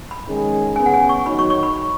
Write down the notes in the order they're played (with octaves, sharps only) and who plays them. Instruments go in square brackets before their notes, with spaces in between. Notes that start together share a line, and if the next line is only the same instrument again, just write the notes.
[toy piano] B5
[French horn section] D#3 G#3 C#4 G#4
[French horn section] C#3 B3 G#4 [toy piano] G#5
[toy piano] F#5
G#5
C#6
[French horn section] D#3 F#3 D#4 F#4 C#5 [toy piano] B5
[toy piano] C#6
C#6
B5